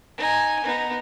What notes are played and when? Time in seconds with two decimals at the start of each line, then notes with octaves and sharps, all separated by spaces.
0.18 D#4 G#5
0.64 B3 D#4